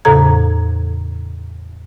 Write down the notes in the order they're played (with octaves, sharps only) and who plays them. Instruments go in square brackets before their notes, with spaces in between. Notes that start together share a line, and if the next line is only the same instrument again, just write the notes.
[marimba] E2 A2 C#3 A4 A#5 G#6